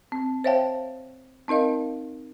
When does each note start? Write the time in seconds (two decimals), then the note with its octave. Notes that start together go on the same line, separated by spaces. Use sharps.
0.12 C4
0.44 C5 C#5 E5 F5 G5 A5
1.48 C4 D#4 A#4 D#5 F5